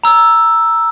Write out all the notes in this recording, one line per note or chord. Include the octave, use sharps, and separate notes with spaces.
A#5 E6